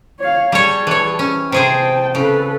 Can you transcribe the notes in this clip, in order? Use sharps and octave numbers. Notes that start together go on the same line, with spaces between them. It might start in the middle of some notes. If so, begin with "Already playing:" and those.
C#5 F5
G3 G#4 C#5 A5
E3 C#5
C#4
C3 G#4 C5 G5 A5
C#3 A4 B4